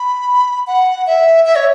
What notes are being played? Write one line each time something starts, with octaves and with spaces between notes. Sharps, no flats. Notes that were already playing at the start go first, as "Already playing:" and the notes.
Already playing: B5
F#5
E5
E5
C#5